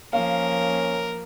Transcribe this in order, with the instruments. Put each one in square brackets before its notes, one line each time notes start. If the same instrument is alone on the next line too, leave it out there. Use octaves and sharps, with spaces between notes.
[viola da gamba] F3 A#3 [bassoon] C#4 [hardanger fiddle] A#4 [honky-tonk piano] F5